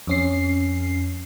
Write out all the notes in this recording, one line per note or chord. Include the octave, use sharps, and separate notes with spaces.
F2 C#4 C7